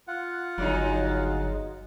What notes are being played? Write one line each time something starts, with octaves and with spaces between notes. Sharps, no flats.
F4 F#5
G1 F#3 G#3 D#4